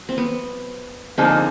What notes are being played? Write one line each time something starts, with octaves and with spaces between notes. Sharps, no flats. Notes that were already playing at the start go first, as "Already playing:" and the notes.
Already playing: F#3
C4
B3
D3 F3 A#3 C4 D#4 G#4